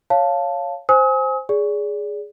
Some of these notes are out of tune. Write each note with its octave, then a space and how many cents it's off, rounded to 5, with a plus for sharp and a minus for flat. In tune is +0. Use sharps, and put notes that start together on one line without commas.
C#5 +0 F5 +0 A5 +0
C5 +0 G#5 +0 D#6 +40
G#4 +0 D5 -25